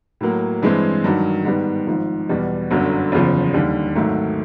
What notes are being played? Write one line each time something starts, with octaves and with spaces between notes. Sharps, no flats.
A2 F#3 A#3
G2 E3 G#3 C4
G2 D#3 F#3
G#2 D#3 G3 B3
G#1 G#2 F3
E2 B2 G3 B3
G1 F#2 D3 F#3
F#1 E2 C#3 F3
D#2 D3 G3
G#1 G#2 D#3 F#3 A3